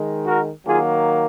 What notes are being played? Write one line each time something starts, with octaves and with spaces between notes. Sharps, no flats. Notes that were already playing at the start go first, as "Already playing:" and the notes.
Already playing: D#3 G#3
F#4 A#4
D#3 F#3 A#3 F4 G#4